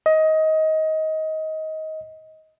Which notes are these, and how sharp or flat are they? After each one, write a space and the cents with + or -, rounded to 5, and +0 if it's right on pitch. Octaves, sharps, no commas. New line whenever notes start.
D#5 +20